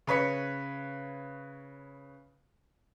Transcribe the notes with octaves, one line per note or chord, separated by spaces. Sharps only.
C#3 B4 C#5 B6 C#7